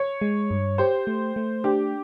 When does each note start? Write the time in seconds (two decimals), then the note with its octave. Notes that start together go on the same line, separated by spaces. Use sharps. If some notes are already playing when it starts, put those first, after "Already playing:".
Already playing: C#5
0.21 G#3
0.51 G2
0.78 G4 C5
1.07 A3
1.36 A3
1.64 D4 G4